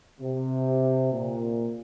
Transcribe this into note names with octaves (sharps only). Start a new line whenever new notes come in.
C3
A#2